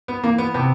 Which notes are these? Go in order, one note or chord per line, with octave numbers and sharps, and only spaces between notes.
B3
E3 A#3
B3
C3 B3